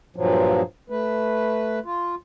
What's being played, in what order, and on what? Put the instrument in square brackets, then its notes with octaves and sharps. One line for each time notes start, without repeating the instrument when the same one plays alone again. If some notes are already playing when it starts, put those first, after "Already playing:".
[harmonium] G2 A#2 F3 F#3
A3 B4
F4